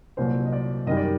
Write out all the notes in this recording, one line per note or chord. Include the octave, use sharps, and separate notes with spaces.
C2 A#2 F#3 C5
D#5
D5
F#2 D#3 G3 D#5
D5